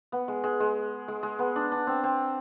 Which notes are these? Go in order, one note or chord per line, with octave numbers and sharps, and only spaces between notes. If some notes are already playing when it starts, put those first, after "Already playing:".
B3
G#3
G#3
G#3
G#3
G#3
B3
D4
D4
C4
C4